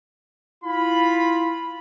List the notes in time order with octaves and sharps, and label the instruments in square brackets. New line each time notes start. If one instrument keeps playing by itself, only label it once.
[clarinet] E4 [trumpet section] F4 B5